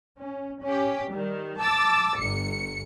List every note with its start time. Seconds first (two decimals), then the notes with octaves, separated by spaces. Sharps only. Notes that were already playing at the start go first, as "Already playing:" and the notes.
0.22 C#4
0.64 C#4 G4
1.12 D#3 G3
1.58 A5 D6 E6 A6
2.18 G1 C#7